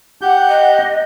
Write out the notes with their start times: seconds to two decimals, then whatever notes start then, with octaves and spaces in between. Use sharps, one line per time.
0.22 G4 F#5 G6
0.49 D#5